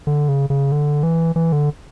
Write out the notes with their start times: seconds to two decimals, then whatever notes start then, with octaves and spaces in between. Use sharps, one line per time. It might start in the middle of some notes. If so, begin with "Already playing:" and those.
0.07 D3
0.28 C#3
0.50 C#3
0.72 D3
1.03 E3
1.36 E3
1.52 D3